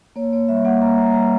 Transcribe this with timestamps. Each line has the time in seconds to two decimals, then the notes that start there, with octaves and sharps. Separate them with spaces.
0.16 A#3 C#5
0.33 A#3 C#5
0.49 G3 E5
0.65 A#3 F#5
0.82 A#3 A#5
0.98 A#3 A#5
1.14 G3 A#5